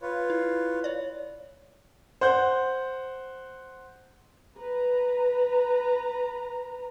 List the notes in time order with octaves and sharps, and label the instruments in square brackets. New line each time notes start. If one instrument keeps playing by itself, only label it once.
[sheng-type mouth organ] F4 B4 C#5
[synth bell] E4
C#5 D5
[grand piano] C5 F#5 G6
[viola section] B4 A#5